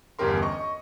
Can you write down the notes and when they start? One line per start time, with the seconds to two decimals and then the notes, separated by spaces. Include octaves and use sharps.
0.19 G1 E2 C#4 G4 A#4 C6
0.42 D#5 C#6